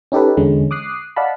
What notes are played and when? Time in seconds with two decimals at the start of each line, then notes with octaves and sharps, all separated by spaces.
0.12 C#4 D#4 G4 A4 B4
0.37 E2 D3 G#3 C#4
0.71 D6 D#6 F#6 C7
1.16 D5 D#5 F5 F#5 A5 B5